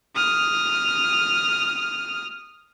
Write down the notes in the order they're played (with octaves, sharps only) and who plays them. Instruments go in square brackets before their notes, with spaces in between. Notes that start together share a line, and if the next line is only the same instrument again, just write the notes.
[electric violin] D#6 F6